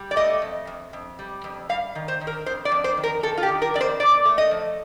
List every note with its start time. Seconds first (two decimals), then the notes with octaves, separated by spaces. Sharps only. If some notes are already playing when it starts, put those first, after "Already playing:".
Already playing: G3
0.11 D5
0.16 A3 D#5
0.42 F2
0.67 F2
0.93 F2
1.19 G3
1.44 F2
1.69 G3 F5
1.95 D#3
2.08 C5
2.21 D#3
2.27 A#4
2.46 F2 C5
2.65 D5
2.72 F2
2.84 C5
2.97 D#3
3.03 A#4
3.23 D#3 A4
3.38 F4
3.43 G4
3.48 D#3
3.62 A#4
3.74 F2 D5
3.81 C5
4.00 A#2 D5
4.25 A3
4.38 D#5
4.51 F3